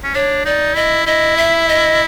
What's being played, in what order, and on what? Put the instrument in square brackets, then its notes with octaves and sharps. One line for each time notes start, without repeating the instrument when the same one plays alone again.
[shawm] C#4
[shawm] D4 [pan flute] C#5
[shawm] D#4 [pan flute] D5
[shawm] E4 [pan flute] D#5
[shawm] E4 [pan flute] D#5
[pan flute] E5
D#5